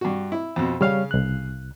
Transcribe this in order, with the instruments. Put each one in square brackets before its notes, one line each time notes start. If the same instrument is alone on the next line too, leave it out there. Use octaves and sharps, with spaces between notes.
[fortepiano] G2 F#4
E4
F2 B2
[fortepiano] C#3 F5 [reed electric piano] G3 C#5 F6
[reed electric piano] C2 F#6